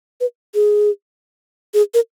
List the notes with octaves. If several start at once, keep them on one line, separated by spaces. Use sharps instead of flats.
B4
G#4
G#4
A#4